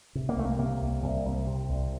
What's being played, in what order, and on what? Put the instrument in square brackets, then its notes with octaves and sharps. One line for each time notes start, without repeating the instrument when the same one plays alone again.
[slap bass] C3
A#3
C2 A3
A#3
C3 A#3
C2
C2
C2
C3
C2